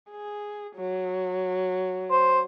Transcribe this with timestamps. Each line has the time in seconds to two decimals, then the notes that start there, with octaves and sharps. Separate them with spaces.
0.10 G#4
0.76 F#3
2.11 C5